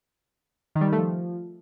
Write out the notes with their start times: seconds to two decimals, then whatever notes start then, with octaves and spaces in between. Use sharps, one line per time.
0.76 D#3
0.81 G3
0.87 D#3
0.93 A3
0.98 F3